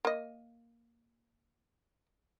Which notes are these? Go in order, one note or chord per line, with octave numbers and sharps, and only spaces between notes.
A#3 D#5